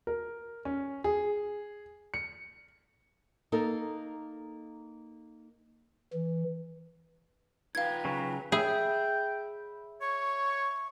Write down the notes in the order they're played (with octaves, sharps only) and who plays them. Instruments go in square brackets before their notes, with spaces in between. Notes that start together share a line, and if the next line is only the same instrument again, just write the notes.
[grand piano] A#4
C#4
G#4
C#7
[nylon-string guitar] A#3 D#4 A4 A#4
[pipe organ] E3
[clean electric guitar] D#4 F4 G5 [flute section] B4 A#5 [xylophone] F5 G#6
[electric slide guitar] C#3 F#3
[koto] G#4 [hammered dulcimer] E5 B5 [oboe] G5
[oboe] C#5 [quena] C#6